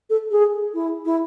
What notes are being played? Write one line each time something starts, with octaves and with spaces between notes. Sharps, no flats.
A4
G#4
E4
E4